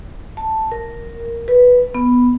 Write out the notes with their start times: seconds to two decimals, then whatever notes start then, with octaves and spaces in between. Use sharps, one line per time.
0.37 A5
0.72 A#4
1.48 B4
1.95 B3